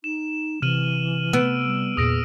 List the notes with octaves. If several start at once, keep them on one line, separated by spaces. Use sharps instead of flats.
D#4 E7
C3 E3 F6 D#7 F#7
B3 E6 D7
G3
E2 A#2 G#4 D#6 A#6 D7